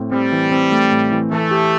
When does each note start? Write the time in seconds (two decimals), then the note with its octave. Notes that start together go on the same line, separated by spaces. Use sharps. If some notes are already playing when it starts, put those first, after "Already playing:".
Already playing: A2 C4
0.12 G3 C4
0.32 E3
0.52 C4
0.72 A3
0.91 A2
1.12 E3
1.31 E3 A3
1.51 G4